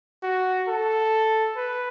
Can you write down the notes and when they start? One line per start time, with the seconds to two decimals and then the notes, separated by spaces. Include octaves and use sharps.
0.23 F#4
0.68 A4
1.56 B4